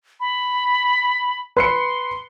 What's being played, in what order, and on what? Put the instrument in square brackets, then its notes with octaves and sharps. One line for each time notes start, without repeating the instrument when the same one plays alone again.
[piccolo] B5
[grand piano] B4 C7 C#7 [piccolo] C6